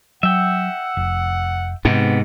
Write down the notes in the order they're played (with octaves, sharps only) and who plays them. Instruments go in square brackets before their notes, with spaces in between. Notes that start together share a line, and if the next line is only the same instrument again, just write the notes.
[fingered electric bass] F#3 [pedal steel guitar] E5 G5 [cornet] F#5
[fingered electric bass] F1
[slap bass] G#2 C3 [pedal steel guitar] B3